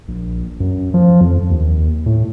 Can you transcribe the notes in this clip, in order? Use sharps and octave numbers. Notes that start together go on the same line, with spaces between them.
A#1
F#2
F3
F2
D#2
A2